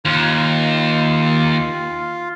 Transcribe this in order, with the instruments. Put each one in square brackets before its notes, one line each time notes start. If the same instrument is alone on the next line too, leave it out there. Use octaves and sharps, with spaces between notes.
[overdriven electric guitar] D#2 [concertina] F4